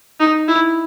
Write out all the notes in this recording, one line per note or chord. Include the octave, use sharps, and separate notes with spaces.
D#4
E4